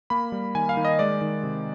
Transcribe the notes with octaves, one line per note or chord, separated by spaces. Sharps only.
A#3 B5
G3
D#3 G#5
F5
D#3
D#5
G#3 D5
D#3
C3